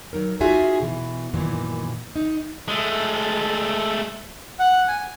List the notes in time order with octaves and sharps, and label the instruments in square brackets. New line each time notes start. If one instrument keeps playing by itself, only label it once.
[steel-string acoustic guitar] F#3 D#4 A#4
D#4 F4 F#4 G#4 E5 G#5
B2 E3
F#2 A#2 D#3 E3
D#4
[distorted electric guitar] G#3 A3
[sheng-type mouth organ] F#5
G#5